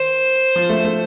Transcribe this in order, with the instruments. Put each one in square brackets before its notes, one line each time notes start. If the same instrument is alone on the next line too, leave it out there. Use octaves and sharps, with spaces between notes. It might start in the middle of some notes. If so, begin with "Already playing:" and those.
Already playing: [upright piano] D#3 [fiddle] C5
[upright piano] F3
A3
A3